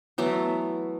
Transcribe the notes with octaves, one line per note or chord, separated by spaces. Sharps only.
E3 F#3 A3 B3